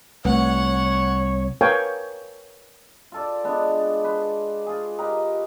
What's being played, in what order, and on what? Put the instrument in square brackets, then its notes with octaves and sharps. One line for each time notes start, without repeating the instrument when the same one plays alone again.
[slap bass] C2 [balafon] A3 B4 [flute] C#5 [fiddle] F#5
[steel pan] A#4 B4 C#5 F5 G5 G#5
[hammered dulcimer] F4 A4 D5
G#3 B3 D4
B4 C5
F4 G#4
D#4 G4 A#4 B4